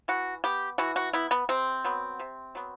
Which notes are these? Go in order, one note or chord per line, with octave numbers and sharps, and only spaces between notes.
E3 F#4
B3 G4
E3 F#4
F#4
B3 E4
B3
C3 C4
F#3 B3
C3
F#3 B3